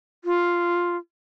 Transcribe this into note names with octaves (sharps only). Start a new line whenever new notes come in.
F4